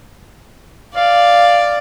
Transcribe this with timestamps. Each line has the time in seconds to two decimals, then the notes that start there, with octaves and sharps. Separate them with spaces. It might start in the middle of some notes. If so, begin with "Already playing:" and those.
0.95 D5 F5